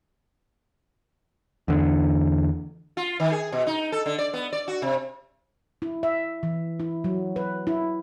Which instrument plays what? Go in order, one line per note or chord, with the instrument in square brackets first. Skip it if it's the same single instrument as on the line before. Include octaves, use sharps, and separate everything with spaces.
[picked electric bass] E2 D3
[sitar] F4
D#3
G#4
B2
D#4
A4
D3
D5
B3
D5
F#4
C3
[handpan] E4
E5
E3
E4
F#3
B4
E4